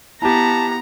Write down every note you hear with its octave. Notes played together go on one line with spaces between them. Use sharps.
B3 E4 G4 A5 A#5